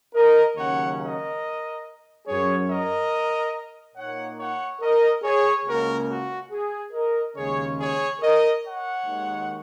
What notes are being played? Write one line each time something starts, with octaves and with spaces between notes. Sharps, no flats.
A#4 D#5
D#2 C#3 F#3 C#4 C#5 F#5
A#4 D#5
F#2 F#3 C#4 G#4 C#5
A#4 D#5
A#2 A#3 D#4 C#5 F#5
C#5 F#5
A#4 D#5
G#4 C#5
C#2 C#3 A#3 C#4 F#4 A#4
F#4
G#4
A#4 D#5
D#2 C#3 G#3 C#4 G#4 C#5
G#4 C#5
A#4 D#5
C#5 F#5
D#2 D#3 G#3 D#4